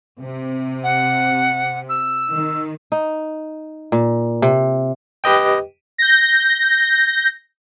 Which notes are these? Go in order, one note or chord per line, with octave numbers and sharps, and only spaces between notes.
C3
F#5
E6
D#3
D#4
A#2
C3
G4 B4 D#5 G5
G6 A#6